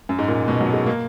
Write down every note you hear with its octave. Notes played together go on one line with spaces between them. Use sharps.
F#2
G#2
A#2
B2
F#3
G#3
A#3